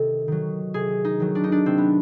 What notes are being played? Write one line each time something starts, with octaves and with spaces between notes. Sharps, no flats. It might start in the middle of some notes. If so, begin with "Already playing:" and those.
Already playing: C3 D#3 A4
D#3 F#3
C3 G#4
D#4
D#3 F#3
D4
D#4
D4
C3 C4
B3